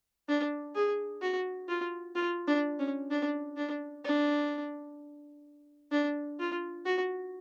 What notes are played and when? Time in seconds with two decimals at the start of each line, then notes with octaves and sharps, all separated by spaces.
0.29 D4
0.75 G#4
1.22 F#4
1.69 F4
2.16 F4
2.48 D4
2.79 C#4
3.11 D4
3.57 D4
4.04 D4
5.91 D4
6.39 F4
6.85 F#4